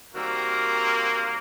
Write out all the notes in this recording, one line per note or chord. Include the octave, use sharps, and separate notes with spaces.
D#3 G3 A#3 C4 F#4 A#4